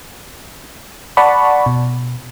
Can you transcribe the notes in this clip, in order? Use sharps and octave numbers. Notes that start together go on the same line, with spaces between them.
D5 F#5 A5 B5 C#6
B2